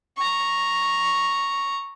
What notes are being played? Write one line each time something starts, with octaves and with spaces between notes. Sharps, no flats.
A#5 C#6